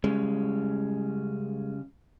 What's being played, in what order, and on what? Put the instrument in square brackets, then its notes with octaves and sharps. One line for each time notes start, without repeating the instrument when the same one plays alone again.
[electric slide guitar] C#3 G3 C#4 [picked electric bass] G#3